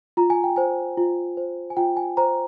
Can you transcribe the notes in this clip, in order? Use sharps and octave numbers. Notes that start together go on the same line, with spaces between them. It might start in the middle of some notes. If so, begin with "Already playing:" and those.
F4 A#5
G#5
G5
C5 G#5
F4
C5
G#5
F4 G5
G#5
C5 A#5